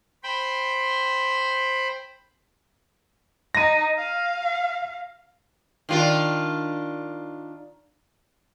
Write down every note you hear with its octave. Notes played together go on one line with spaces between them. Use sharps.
C5 G5 B5
D#4 A#6 D#7
F5
D#3 D4 F4